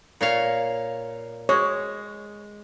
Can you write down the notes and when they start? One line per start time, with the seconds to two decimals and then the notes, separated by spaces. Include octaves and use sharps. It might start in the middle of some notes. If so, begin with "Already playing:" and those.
0.21 A#2 C#5 F5
1.49 G#3 C#5